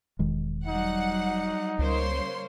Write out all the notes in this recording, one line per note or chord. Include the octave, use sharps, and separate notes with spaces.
E1 D#3 G#3
F#3 G3 D#4 F#5
C#2 C#3 G3 A#3 C5 C#5 C6